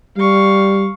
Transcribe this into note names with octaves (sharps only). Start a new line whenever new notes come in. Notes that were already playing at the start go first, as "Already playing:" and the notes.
G3 F5 C#6